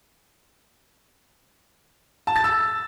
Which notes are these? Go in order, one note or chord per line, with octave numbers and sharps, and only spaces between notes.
A5
A6
E6